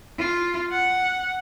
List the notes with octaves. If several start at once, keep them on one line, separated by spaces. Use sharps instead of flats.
F4
F#5